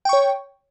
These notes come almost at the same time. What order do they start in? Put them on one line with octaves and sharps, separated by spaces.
G5 C#6 C#5